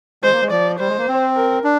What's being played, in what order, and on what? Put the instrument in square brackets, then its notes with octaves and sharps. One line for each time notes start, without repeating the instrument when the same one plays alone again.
[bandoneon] G#3 [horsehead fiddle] C5
[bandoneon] A#3
G#3
[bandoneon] F3 [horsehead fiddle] D5
[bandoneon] G3 [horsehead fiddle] C5
[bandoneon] G#3
A#3
C4
[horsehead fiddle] A#4
[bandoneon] D4